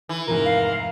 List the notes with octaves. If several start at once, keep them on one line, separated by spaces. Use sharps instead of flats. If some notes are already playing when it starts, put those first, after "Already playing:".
E3
F1 E2 G#2 A#4
F5